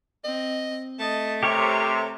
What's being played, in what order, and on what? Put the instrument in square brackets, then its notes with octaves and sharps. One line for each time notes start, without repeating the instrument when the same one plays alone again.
[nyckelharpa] C4 [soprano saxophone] D#5
[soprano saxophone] A3 [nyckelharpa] D#5 A5
[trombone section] C3 [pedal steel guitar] G4 A#4 C#5 [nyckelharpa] C#6